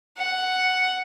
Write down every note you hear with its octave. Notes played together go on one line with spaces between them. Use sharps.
F#5